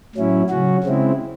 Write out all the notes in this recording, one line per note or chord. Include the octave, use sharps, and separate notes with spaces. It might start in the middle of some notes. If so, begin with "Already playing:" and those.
A2 F#3 C#4 E4
C#3 F#3 C#4 F#4
C#3 G#3 C4 E4